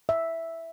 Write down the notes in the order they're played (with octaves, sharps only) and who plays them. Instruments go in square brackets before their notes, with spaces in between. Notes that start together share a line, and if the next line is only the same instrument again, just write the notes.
[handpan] E5